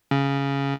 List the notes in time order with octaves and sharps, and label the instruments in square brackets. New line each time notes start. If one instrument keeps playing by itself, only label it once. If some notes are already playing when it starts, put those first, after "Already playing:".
[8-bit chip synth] C#3